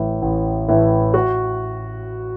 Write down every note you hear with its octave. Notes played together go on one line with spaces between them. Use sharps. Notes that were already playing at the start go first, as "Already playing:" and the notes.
Already playing: A1 A2 E3
A1
A2 E3
F#4